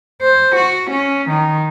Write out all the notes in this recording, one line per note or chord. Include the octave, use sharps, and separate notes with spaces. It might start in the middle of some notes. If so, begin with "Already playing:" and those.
C5
F#4
C#4
D#3